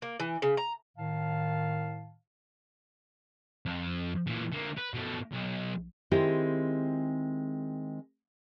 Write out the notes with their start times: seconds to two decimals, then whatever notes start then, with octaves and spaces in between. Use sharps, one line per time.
0.02 A#3
0.20 E3
0.42 C#3
0.57 A#5
0.98 A2 D#3 F5 A5
3.66 F2
4.27 A#2 E3
4.52 D3 A#3
4.77 B4
4.94 B2 A3
5.32 B1
6.11 D#3 G#3 C4 E4 G4 G#4